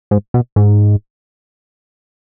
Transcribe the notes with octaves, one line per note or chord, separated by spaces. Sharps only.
G#2
B2
G#2